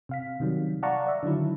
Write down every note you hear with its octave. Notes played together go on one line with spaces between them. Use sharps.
C3 F5 B6
C3 D#3 F#3 G3
D5 F5 F#5 A5 A#5 C#6
D5 E5
D3 D#3 F#3 E4